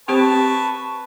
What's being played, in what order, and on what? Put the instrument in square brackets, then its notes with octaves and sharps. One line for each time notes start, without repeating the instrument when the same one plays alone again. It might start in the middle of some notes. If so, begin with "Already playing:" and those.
[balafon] C4 G4 C5 [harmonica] B4 A5 C#6